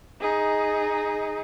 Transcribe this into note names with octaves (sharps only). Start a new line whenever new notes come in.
D#4 G#4